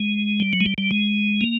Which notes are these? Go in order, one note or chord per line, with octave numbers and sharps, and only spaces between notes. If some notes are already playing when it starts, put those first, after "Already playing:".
Already playing: G#3
G3
F#3
G#3
G3
G3
G#3
A#3